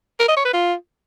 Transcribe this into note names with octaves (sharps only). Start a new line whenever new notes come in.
A#4
D#5
C#5
B4
F4